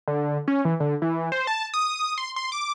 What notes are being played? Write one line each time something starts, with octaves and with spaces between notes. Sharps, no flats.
D3
C#4
E3
D3
E3
C5
A5
D#6
C6
C6
D6